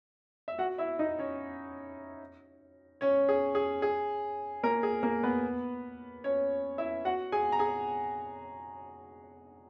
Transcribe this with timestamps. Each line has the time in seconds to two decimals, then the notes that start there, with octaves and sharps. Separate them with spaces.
0.48 E5
0.59 F#4 F#5
0.78 E4 E5
0.99 D#4 D#5
1.19 C#4 C#5
3.01 C#4 C#5
3.29 G#4
3.55 G#4
3.82 G#4
4.63 A#3 A#4
4.83 G#4
5.03 A#3 A#4
5.23 B3 B4
6.24 C#4 C#5
6.78 E4 E5
7.05 F#4 F#5
7.32 G#4 G#5
7.52 A#5
7.59 G#4 G#5